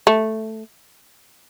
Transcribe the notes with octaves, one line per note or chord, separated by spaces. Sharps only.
A3